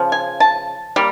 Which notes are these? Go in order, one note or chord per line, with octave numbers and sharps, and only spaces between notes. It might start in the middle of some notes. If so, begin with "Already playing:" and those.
Already playing: C#3 F3
G#5
A5
G3 A#3